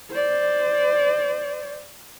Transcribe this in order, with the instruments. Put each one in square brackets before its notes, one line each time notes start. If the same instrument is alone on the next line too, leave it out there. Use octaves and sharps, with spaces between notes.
[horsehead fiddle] C5 D5